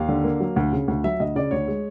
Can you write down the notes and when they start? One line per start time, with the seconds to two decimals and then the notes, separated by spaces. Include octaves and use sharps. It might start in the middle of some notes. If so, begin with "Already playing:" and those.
Already playing: D#2 F5
0.08 D3
0.24 A#3
0.40 F#3
0.56 D2
0.73 C#3
0.88 D2
1.04 F#3 E5
1.20 D2 D#5
1.35 C#3 D5
1.51 D2 C#5
1.68 G#3